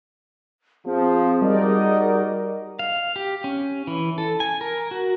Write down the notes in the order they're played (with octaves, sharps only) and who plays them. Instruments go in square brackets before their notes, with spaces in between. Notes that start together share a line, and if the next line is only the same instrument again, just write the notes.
[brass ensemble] F3 F4 [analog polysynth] C4 [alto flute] G#4
[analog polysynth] G3 A#4 D5 [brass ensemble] D#4 F#4 D#5
[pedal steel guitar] F5
G4
C#4
E3
A4
G#5
A#4
F#4